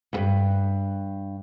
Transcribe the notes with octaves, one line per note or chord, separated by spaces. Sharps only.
D2 G2